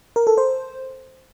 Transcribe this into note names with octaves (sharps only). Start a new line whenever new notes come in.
A#4
A4
C5